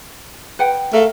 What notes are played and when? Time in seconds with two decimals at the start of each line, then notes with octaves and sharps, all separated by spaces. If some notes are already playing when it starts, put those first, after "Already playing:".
0.59 B4 F#5 G5
0.93 A3 A#4 F5